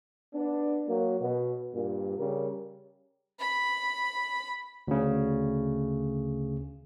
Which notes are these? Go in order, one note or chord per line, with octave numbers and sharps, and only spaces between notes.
B3 D4
F#3 A#3
B2
G2 A#2
C#3 G3 A#4
B5
D2 C#3